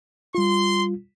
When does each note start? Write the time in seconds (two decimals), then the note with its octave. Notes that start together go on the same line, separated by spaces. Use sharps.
0.35 G3 F4 C6